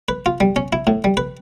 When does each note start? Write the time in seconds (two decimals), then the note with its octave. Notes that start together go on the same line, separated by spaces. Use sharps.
0.09 B4
0.26 F4
0.40 G3
0.56 C#4
0.73 E4
0.87 A2
1.04 G3
1.17 B4